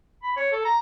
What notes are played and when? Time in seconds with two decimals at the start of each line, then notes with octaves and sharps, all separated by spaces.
0.23 B5
0.37 C#5
0.52 A4
0.65 A#5